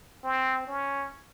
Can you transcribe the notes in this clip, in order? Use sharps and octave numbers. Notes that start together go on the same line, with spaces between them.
C4
C#4